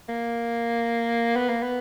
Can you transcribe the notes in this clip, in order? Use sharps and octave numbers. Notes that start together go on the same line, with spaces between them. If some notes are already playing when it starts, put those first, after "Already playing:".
A#3
B3
A#3
B3